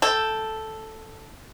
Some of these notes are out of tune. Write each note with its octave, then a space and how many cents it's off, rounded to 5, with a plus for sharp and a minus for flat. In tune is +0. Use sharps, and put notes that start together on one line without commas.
A4 +0 G5 +0